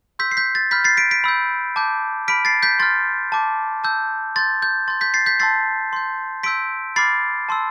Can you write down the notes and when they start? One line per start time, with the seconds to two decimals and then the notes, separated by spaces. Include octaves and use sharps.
0.19 C6 E6 G6 B6
0.31 C7
0.37 G6 B6
0.55 A6
0.71 B5 F6 G6 B6
0.84 A6 C7
0.97 B6 D7
1.11 B6 D7
1.24 B5 E6 G6
1.76 A5 D6 G6
2.28 B5 F6 B6 D7
2.45 A6 C7
2.63 G6 B6
2.79 C6 F6 A6
3.32 A5 D6 G6
3.84 A5 E6 G6
4.36 C6 G6 A6
4.62 G6
4.88 C6 G6 A6
5.01 G6 B6
5.14 A6 C7
5.26 G6 B6
5.40 A5 C6 E6 A6 C7
5.93 C6 G6
6.43 C6 E6 G6 B6 D7
6.96 B5 D6 F6 A6 C7
7.49 A5 C6 E6